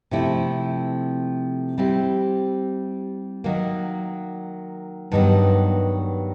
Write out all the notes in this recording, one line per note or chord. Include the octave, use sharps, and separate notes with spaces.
C3 F3 A3 C4 E4
G3 C4 E4 G4
D#3 F#3 A#3
G2 D#3 F#3 B3